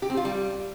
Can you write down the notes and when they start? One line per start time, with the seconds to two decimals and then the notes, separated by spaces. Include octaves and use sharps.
0.02 G4
0.10 C4
0.17 F4
0.25 G3